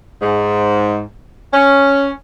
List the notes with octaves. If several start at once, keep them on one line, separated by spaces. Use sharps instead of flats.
G#2
C#4